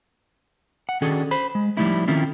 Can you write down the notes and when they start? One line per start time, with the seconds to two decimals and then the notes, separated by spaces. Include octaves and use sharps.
0.89 F#5
1.02 D#3 C#4 D4 F#4 G#4 A4
1.31 C5 B5
1.55 G#3
1.77 F3 G3 A3 D#4 E4
2.07 D#3 C4 C#4 E4 F4 A4